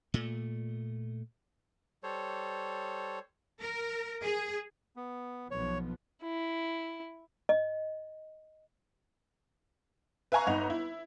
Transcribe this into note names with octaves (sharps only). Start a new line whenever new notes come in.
A#2 A3
G3 A4 C5 C#5
A#4
G#4
B3
B1 F3 B3 C#5
E4
D#5
B4 E5 F5 G#5 A#5 C#6
G1 D#4 F#5 F7
E4